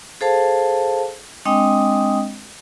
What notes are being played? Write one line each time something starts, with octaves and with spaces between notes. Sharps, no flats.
G#4 A4 C5 F5 A5
G#3 C4 D4 D#5 G5 D#6